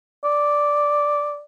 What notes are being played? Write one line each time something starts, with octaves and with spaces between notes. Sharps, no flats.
D5